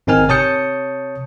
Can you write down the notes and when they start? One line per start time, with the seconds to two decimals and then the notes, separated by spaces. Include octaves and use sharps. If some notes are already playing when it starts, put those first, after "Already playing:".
0.07 G#1 C4 D#4 A#4 G#5 F6
0.29 C3 C#5 A5 D#6 G6 C#7